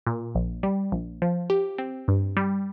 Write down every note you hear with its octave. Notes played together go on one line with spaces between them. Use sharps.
A#2
A#1
G3
A#1
F3
G4
C4
G2
G3